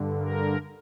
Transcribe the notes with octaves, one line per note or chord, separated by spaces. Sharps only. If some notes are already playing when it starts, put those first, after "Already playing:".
Already playing: G2 D3
A#4